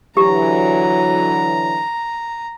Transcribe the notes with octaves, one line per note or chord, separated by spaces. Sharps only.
D3 E3 F#3 G4 A#5